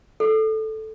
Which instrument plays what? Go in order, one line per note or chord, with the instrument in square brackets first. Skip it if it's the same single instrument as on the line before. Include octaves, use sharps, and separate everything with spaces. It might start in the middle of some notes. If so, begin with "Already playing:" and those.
[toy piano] A4